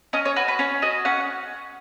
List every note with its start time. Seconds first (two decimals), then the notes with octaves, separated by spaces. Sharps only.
0.13 C#4 D#5
0.25 C#5
0.36 F#4 B4
0.48 B4
0.59 C#4 C#5
0.82 F#4 D#5
1.05 C#4 F#5